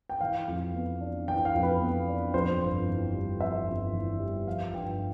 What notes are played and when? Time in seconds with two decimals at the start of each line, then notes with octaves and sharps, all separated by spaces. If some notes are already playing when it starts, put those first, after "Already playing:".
0.09 G5
0.21 E3 F5
0.48 F2
0.74 B3
1.01 D4
1.28 E3 G5
1.45 F5
1.55 F2
1.63 B4
1.80 B3
2.08 D4
2.34 F2 C5
2.61 G1
2.87 E3
3.13 G3
3.40 F2 E5
3.67 G1
3.93 E3
4.20 G3
4.47 F3 F5
4.73 G2 G5